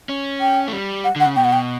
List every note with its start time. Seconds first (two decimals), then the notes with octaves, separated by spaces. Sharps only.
0.09 C#4
0.41 G5
0.68 A3
0.73 G3
1.04 F#5
1.16 D3 F#5
1.26 C#3
1.36 B2 G5
1.44 F#5
1.53 G5